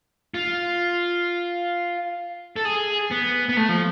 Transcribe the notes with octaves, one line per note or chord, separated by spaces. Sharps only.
F4
A4
G#4
B3
B3
A3
F3